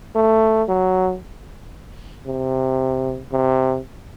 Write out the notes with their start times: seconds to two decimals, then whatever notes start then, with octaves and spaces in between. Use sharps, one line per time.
0.16 A3
0.69 F#3
2.26 C3
3.32 C3